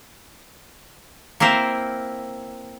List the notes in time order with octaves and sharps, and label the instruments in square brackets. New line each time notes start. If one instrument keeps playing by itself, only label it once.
[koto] A#3 C4 E4 A#4 C5